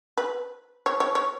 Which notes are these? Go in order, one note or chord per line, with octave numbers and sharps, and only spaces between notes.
B4
C#5
C#5
C#5